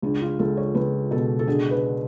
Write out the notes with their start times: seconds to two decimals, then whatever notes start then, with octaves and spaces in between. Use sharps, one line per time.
0.02 C#2 D4
0.22 F4
0.39 C#2 A4
0.57 C#5
0.75 C#2 B4
1.11 B2 A4
1.39 A4
1.47 D3 G#4
1.71 B4